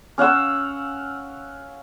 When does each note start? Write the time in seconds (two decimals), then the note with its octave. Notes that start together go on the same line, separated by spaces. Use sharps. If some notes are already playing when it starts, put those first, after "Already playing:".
0.18 C#4 F5 F#5 E6